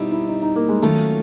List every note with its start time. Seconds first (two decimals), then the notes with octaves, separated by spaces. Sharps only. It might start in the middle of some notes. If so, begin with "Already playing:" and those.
Already playing: B2 G3 C4 D#4 E4
0.11 E4
0.29 D#4
0.42 D#4
0.56 A#3
0.69 G#3
0.82 D#3 F#3 A3 A#3 C#4 F4